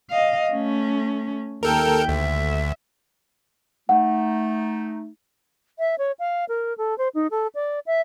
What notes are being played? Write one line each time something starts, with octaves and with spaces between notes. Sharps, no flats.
D#5 F5
A3 C#4
D#2 A4 A#4 G5
D2 E5
A3 D#4 F#5
E5
C#5
F5
A#4
A4
C5
D#4
A4
D5
E5